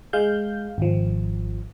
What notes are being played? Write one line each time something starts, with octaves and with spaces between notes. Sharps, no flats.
G#3 F5 G6
G#1 F3